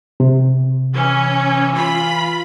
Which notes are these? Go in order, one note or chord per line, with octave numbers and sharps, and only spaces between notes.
C3
E3 C#4
F4 B5